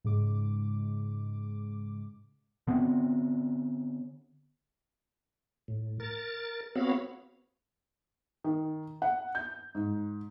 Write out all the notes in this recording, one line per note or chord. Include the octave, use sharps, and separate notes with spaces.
G#2 C#3 G#3 D6
D3 B3 C4
A2
A#4 A6
B3 C4 F#4 C#5 F5 B5
D#3
F#5
G6
G#2